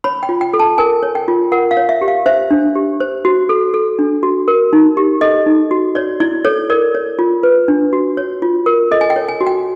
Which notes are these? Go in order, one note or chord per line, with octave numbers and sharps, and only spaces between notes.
C#5 B5
G5
F4
G5
A4
A5
A#4 G#5
C#5
G5
F4
A#4 F#5
F5
C#5
E5
G4
F5
C5 E5
D4
G4
C5
F#4
A4
A4
D4
F#4
A#4
D#4
G4
A4 D#5
D#4
F#4
C#5 D5
E4 D5
A4 C#5
A#4 D5
C#5
F4
B4
D4
F#4
C#5
F4
A#4
A4 D#5
G#5
G5
C#5
G#5
F#4
G5